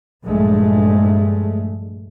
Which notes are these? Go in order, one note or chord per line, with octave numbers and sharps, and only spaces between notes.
A#1 G2 G#3 A3